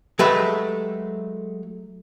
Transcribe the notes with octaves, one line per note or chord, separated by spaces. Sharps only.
F#3 G#3 A3 G4 B4